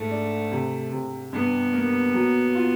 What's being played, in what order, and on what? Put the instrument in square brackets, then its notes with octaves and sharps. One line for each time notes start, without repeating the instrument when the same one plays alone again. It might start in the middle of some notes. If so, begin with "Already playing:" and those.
Already playing: [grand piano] G#2 [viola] A3
[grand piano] D4
C3
C3
[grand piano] G2 [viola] B3
[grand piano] A#3
F#3
F4